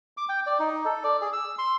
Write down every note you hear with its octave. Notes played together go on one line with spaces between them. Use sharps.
D6
G5
D5
D#4
A4
D5
G#4
E6
C6